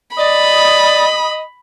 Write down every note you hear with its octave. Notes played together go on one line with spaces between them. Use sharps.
D5 D#5 B5